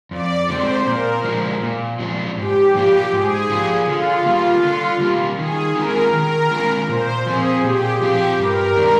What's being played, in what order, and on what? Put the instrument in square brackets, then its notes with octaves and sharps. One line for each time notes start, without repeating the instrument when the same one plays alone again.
[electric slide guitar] F2 [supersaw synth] D5
[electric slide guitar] D3 G#3 C4 [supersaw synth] C5
[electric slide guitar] A#2 [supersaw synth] A#4
[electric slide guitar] F3 G#3 D4
A#2
F3 G#3 D4
[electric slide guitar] G#2 [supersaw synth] G4
[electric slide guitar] F3 A#3 F4 [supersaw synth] G4
[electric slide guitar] G#2 [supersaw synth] G#4
[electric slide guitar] F3 A#3 F4
[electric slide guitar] D3 [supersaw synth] F4
[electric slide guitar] G3 A#3
D3
G3 A#3
[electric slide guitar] D#3 [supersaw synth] G#4
[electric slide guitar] G#3 D4 F4 [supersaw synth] A#4
[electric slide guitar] D#3 [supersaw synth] A#4
[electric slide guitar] G#3 D4 F4
[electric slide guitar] A#2 [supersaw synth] C5
[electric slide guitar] F3 C4 F4 [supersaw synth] G#4
[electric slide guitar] A#2 [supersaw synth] G4
[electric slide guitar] F3 C4 F4 [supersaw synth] G4
[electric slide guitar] G2 [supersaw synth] A#4
[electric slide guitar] D#3 G#3 D4